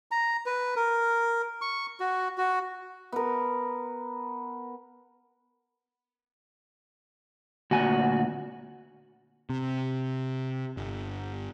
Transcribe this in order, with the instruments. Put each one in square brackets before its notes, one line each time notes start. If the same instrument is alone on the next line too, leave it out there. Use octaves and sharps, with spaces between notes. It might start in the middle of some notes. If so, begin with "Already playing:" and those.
[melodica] A#5
B4
A#4
C#6
F#4
F#4
[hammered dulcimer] B3 A#4
[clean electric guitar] D2 A#2 G#5 [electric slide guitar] F#4
[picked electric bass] C3
G1